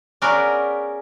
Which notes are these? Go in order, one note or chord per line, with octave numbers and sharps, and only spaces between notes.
B3 C#4 F#4 G#4 A#4 D5